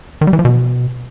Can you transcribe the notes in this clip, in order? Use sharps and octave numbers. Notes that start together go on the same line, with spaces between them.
D#3
G3
E3
F3
B2